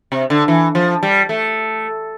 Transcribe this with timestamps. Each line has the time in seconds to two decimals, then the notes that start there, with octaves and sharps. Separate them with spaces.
0.12 C3
0.30 D3
0.48 E3
0.75 F3
1.03 G3
1.29 A3